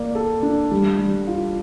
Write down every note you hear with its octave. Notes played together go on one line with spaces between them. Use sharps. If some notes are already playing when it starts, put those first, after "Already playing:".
Already playing: A#3 D5
A4
D4
G3
G3
F4